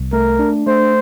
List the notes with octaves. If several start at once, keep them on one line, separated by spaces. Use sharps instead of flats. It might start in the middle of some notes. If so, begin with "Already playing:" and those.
Already playing: C2
A3 A#4
D4
A3 C5